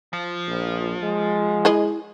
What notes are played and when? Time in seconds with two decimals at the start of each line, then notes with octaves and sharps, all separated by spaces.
0.13 F3
0.47 A#1
1.03 G#3
1.65 E4 G#4 D#5